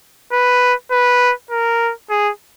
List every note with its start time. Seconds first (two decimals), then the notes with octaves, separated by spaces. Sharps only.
0.32 B4
0.91 B4
1.51 A#4
2.10 G#4